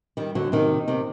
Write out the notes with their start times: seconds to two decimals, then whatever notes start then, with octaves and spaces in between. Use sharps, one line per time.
0.17 D#3 G3
0.35 D3 F#3
0.52 C3 D#3
0.88 C3 D#3